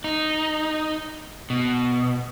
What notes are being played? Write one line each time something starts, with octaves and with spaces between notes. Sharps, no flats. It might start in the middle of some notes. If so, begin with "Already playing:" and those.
D#4
B2